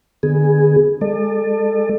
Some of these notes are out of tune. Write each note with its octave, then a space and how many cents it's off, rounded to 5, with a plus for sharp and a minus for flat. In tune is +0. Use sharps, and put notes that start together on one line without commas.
D3 +35 B3 +0 G#4 +0
G#3 -20 A4 +10 D5 +45